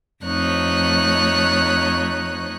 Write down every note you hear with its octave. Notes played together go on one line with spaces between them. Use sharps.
F2 A3 D#4 C#5 F#6